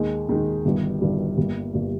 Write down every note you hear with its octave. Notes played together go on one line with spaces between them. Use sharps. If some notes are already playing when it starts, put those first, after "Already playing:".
Already playing: D#2 D#3 G#3 D#4
D#2 D#3 G#3 D#4
G1 G2 D#3 G3
G1 G2 D#3 G3
G1 G2 G3 A#3
G1 G2 G3 A#3